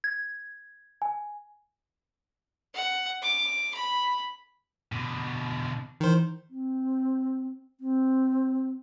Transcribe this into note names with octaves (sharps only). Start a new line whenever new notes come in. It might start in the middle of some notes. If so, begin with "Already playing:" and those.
G#6
G#5
F#5
D6
B5
B2 D3
D#3 E3 C5
C4
C4